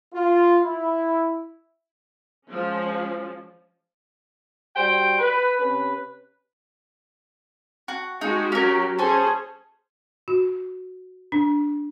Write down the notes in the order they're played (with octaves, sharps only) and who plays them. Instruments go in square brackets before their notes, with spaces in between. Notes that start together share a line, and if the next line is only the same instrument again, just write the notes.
[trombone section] F4
E4
[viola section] F3 G#3 C#4
[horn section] G3 F#4 C5 G5
B4
C3 C#4 B4
[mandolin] F#4
[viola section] G#3 F#4 G4 [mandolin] D#4
[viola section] F#3 G4 [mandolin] C#4 A#4
[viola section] C#4 G#4 C5 [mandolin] A4 G#5 C#6
[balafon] F#4
D4